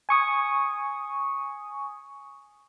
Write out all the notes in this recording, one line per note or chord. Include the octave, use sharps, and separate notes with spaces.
G#5 C#6 D#6